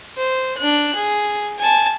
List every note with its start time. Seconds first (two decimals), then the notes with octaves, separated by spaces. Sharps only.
0.17 C5
0.58 D4 F#6
0.95 G#4
1.59 G#5 A5